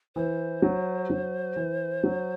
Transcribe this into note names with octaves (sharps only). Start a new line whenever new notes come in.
E3 C5
F#3
F#3
E3
F#3